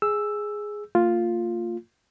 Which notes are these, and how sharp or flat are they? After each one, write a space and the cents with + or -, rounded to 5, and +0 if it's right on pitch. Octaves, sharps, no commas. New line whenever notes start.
G#4 +0 E6 +0
A#3 -45 F4 +0